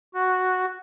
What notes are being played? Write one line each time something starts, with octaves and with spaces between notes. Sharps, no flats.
F#4